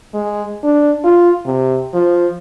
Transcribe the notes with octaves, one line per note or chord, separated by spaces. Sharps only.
G#3
D4
F4
C3
F3